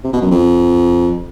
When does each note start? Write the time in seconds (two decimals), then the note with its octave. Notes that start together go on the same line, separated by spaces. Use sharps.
0.04 C3
0.13 B2
0.22 F#2
0.31 F2